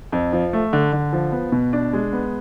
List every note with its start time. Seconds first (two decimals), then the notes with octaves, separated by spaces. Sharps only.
0.12 F2
0.33 F3
0.53 A3
0.73 D3
0.93 D3
1.13 F3
1.32 B3
1.52 B2
1.73 D4
1.93 G#3
2.13 B3